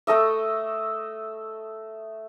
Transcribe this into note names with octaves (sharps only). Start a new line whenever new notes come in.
A3 A4 D#5 E5